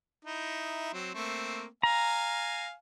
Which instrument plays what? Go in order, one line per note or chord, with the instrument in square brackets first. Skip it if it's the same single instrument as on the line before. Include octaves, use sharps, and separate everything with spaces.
[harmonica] D#4 E4
F#3 C4
A3 A#3 C4
[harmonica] F5 G#5 [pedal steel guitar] A#5